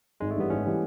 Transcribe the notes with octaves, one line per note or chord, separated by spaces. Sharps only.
G#1 G#3
A3
G2 E3 G3 B3
G#1 C#4
E3 G3